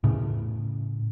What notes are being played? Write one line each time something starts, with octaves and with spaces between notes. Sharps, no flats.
A2 C#3